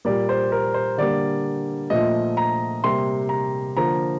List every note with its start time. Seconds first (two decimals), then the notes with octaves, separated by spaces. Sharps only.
0.05 A#2 G3 A#3 D5
0.29 C5
0.52 A#4
0.74 C5
0.98 D3 G3 A#3 D5
1.90 A#2 F3 A3 D#5
2.37 A#5
2.84 C3 G3 A#3 C6
3.29 A#5
3.77 D3 F3 A#3 A#5